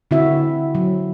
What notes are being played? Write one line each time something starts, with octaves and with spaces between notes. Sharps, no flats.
D3 C4 E4 F#4 E5
F#3